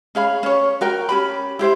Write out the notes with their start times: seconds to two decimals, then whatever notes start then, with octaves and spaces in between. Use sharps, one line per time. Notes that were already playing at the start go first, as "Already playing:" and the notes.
0.15 C#4 G#4 F5 B5
0.43 C#4 C#5
0.81 F#4 A#4 G5
1.09 C#4 G4 B5
1.59 E4 G4 C5 E5